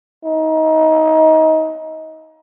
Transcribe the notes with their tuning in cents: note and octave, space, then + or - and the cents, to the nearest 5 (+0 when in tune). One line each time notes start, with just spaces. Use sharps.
D#4 +25